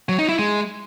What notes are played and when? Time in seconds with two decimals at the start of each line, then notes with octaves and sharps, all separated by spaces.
0.09 F#3
0.19 D#4
0.29 E4
0.39 G#3